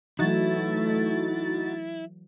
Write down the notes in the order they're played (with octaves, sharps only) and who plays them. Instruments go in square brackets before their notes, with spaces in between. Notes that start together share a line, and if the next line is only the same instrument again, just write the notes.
[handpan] E3 F#3 [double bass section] A3 [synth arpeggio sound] D#4 F#4 A6 [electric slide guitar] E4